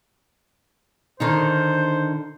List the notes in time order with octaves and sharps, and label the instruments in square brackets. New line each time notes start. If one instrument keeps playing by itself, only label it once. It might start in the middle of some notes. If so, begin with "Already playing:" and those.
[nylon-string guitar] D3 D#3 D#4 [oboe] C5